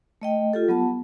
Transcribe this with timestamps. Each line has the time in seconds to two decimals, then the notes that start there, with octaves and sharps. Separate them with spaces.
0.21 A3 D#5 G5
0.53 F4 G4 A4
0.68 F#3 B3 F#5 A5